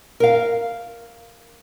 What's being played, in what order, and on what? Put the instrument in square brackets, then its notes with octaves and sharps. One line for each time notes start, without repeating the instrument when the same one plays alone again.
[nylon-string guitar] A#4 F5